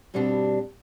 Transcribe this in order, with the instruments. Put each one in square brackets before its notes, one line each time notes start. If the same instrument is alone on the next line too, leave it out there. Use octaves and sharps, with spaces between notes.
[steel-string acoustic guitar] G2 B2 G3 C4 D4 G4